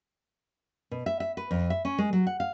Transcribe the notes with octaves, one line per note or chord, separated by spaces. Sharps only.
B2
E5
E5
B4
F2
E5
C#4
G#3
F#3
F#5
F5